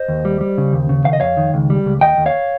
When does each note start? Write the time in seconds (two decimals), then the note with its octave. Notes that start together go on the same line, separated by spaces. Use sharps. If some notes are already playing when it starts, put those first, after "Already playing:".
Already playing: C5 D#5
0.08 D#2
0.25 G3
0.41 G3
0.58 C#3
0.73 D#2
0.89 C#3
1.05 D#3 F5
1.13 D#5
1.20 F2 C#5 F5
1.37 D#3
1.54 C#2
1.70 G3
1.86 C#2
2.01 D#2 D#5 G5
2.17 D#2
2.26 C#5 F5